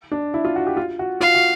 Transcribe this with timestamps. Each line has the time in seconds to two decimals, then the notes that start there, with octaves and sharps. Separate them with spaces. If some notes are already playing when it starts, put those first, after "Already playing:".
0.12 D4
0.34 E4
0.45 F4
0.56 F#4
0.67 G4
0.77 F4
0.99 F#4
1.21 F4 F5
1.35 F#4